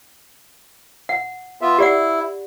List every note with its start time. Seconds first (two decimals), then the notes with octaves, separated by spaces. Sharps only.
1.09 F#5
1.61 B3 F4 E5
1.79 E4 G4 D5 F#5